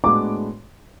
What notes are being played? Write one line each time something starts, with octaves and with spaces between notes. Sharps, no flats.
A2 G#3 B3 D4 F#4 D6